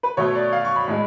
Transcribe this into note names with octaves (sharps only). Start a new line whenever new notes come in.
B4
B2 A3 C#5
D5
F5
C#6
B5
A2 G#3